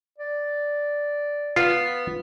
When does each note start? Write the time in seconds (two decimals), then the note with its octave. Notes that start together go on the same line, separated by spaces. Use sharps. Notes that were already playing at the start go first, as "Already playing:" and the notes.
0.18 D5
1.56 B3 F4